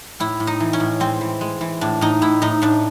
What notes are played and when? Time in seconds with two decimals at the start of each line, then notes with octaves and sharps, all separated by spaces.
0.20 A2 E4
0.40 A2
0.47 D#4
0.60 E3
0.73 C#4
0.80 A2
1.00 G#3 C4
1.21 E3
1.41 G#3
1.61 E3
1.81 A2 D4
2.01 A2 D#4
2.22 A2 E4
2.42 A2 D#4
2.62 A2 D4